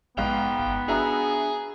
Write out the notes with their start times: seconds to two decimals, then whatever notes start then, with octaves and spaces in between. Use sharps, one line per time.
0.17 A#1 G#2 B3 F5 G5 F7
0.60 G1
0.88 D4 F#4 G#4 E5 A#5